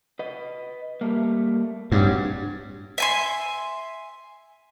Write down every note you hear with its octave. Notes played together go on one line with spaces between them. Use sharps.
B4 D#5
G3 A3 A#3
G2 C4 F#4 C#5
E5 G#5 C6